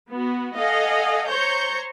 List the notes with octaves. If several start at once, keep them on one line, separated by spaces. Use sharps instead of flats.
B3 F#4
A4 D#5 F5 F#5 G#5
C5 C#5 A#5 C#6 G6